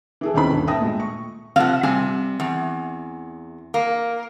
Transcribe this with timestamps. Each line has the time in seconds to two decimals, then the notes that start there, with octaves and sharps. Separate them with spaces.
0.21 E3 G#4 A4
0.34 D#1 D#3 C4 C#4 B5
0.51 D#1 G2
0.67 E5 G5 A5 D#6 A#6
0.81 A#2 G#3 A3
1.00 C#6
1.56 C3 F3 F5 F#5
1.83 C3 G3 G#5
2.40 E2
3.74 A#3